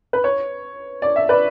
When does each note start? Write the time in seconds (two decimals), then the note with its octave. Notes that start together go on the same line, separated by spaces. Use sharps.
0.13 B4
0.24 C#5
1.02 D5
1.16 E5
1.29 B4 D5